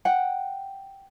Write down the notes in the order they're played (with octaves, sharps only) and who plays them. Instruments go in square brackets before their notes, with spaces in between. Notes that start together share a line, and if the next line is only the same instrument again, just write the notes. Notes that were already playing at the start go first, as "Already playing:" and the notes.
[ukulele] F#5 G5